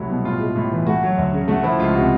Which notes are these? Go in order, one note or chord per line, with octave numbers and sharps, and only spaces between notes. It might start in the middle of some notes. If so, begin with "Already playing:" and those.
Already playing: C2 F#3 A3 E4
B2
A2 F4
G#3
A2
E3
A3 F#4
F#3
D2
C#3
A3 F#4
F3 E4
C#2 F4
C3 F#4